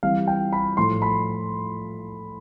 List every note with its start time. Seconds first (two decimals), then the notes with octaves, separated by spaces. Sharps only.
0.03 E3 G3 C4 E4 F5
0.27 G5
0.53 B5
0.77 A2 F3 A3 C6
1.02 B5